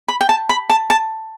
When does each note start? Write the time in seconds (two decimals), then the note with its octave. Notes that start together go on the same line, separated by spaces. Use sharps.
0.08 B5
0.21 G5
0.29 A5
0.49 B5
0.70 A5
0.90 A5